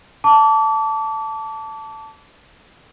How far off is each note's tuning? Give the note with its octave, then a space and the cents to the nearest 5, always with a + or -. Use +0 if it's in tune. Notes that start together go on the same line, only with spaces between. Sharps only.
A5 +0 D6 -35